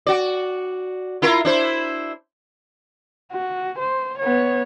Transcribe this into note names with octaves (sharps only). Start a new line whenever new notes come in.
F#4 D5
E4 F4 A#4
D4 E4 C5
F#4
C5
B3 C#5